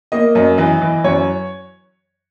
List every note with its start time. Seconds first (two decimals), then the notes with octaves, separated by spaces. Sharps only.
0.12 A#3 D#5
0.35 F#2 D#5
0.58 E3 D#5
0.82 E3
1.04 F#2 C#5